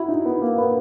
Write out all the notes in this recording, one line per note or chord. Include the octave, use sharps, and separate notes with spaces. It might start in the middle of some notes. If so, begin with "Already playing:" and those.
Already playing: E4 F#4
D#4
B3
A#3
B3